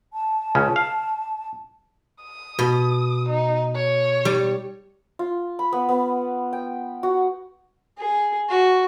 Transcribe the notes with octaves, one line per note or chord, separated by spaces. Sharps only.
A5
C#2 C#3 C#4
F5
D#6
B2
D#4
C#5
G3
F4
B5
B3
B3
G5
F#4
G#4
F#4